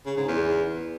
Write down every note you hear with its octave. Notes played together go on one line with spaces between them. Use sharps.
C#3
G#2
E2